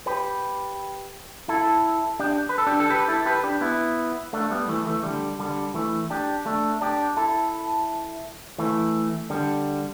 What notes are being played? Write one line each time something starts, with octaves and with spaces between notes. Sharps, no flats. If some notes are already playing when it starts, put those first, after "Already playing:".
G4 B4
E4 A4
D4 G4
B4
A4
D4 G4
A4
G4 B4
E4 A4
G4 B4
D4 G4
B3 E4
A3 D4
G3 B3
E3 A3
E3 A3
D3 G3
D3 G3
E3 A3
D4 G4
A3 D4
D4 G4
E4 A4
E3 A3
D3 G3